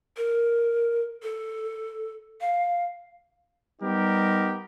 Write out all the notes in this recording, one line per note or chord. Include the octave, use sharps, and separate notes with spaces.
A#4
A4
F5
G3 B3 D#4 G4 A#4